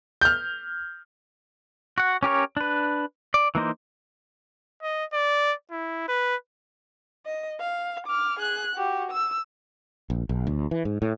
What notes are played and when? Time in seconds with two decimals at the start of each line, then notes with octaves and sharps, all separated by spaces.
0.21 F6 G6
1.98 F#4 F#5
2.23 C#4 G4 A#4 C#5
2.57 D4 B4
3.34 D5
3.55 E3 A#3 D#4 C5
4.82 D#5
5.13 D5
5.71 E4
6.08 B4
7.26 D#5
7.60 F5
8.07 D6 F6
8.39 G#4 F#6
8.76 F#4 G4
9.12 E6
10.10 A#1
10.29 B1
10.47 D2
10.71 E3
10.85 G#2
11.02 A2